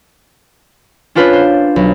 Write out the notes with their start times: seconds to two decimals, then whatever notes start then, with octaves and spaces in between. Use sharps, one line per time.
1.15 C#4 D4 F4 B4 C#5
1.33 C5
1.76 B1